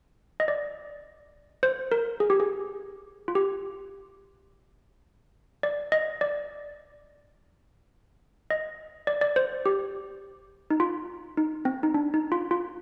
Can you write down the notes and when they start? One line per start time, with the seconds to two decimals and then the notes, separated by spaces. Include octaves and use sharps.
0.40 D#5
0.48 D5
1.63 C5
1.92 A#4
2.20 G#4
2.30 G4
2.40 G#4
3.28 F4
3.35 G4
5.63 D5
5.92 D#5
6.21 D5
8.50 D#5
9.07 D5
9.21 D5
9.36 C5
9.66 G4
10.70 D#4
10.80 F4
11.37 D#4
11.65 C4
11.83 D#4
11.94 D4
12.14 D#4
12.32 F4
12.51 F4